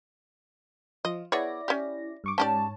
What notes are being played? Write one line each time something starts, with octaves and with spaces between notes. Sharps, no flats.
F3 F4 D#5
B3 E4 G#4 C#5 D5 A#6
C#4 G4
G2 C#6 D6
G#2 C#4 G4 C#5 D5 A5